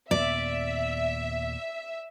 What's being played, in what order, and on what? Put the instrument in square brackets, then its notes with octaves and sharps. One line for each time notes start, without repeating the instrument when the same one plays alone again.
[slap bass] D#2 A#2 B3 [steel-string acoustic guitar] D5 [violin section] E5